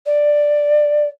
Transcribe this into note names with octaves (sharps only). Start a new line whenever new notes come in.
D5